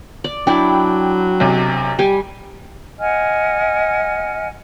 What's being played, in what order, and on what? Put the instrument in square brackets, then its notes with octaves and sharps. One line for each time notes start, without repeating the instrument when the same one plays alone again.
[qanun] D5
[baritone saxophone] F#3 [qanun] D4 E4 [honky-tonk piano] G5
[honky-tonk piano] B1 C3
[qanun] G3 G#5 [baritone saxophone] G4
[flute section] D#5 F#5 G#5 F6